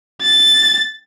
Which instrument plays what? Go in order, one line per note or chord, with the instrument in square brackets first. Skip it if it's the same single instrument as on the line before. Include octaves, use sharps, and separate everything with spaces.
[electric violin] A6